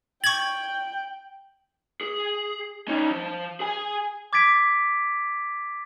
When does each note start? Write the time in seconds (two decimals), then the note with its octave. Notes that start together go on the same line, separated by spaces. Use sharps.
0.24 G5 C#6 G#6 F#7
2.01 G#4
2.88 C#4 D#4
3.11 F3
3.60 G#4 G#5
4.33 D6 G#6 A6 B6 D7